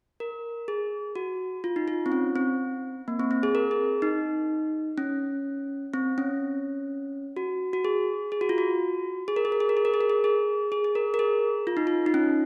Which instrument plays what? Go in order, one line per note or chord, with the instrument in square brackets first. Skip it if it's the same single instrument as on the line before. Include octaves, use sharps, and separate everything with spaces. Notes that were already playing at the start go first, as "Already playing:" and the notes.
[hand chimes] A#4
G#4
F#4
F4
D#4
F4
C4
C#4
C4
A#3
C4
C4
G#4
A#4
G#4
D#4
C#4
C4
C#4
F#4
F#4
G#4
G#4
F#4
F4
F#4
G#4
A#4
G#4
A#4
G#4
A#4
G#4
A#4
G#4
A#4
G#4
G#4
G#4
G#4
A#4
A#4
G#4
F4
D#4
F4
D#4
C#4